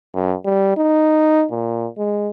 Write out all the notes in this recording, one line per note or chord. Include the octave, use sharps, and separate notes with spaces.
F#2
G3
D#4
A#2
G#3